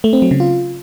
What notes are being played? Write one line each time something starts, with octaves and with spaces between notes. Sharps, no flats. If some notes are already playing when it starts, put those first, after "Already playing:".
A3
C4
F#3
C#3
F4